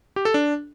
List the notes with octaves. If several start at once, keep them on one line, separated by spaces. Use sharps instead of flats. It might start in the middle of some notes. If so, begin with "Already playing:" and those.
G4
A4
D4